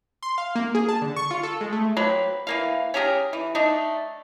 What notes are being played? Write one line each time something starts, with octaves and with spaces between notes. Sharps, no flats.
C6
F5
A#3
G#4
A5
D3
C#6
F4
A4
G#3
A3
F#3 A#3 C4 B4
E3 A#3 F5
C#4 G4 G#4 A#4
E3
A3 D4 D#4